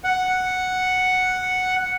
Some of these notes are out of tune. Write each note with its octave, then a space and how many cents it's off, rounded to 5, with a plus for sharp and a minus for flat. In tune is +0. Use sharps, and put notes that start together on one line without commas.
F#5 +0